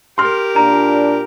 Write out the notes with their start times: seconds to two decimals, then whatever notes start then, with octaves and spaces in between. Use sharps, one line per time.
0.18 G4 A#4 C6 F6
0.56 A#2 D4 A#5